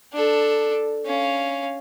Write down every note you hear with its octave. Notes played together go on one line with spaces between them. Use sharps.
D4 A4
C#4 F5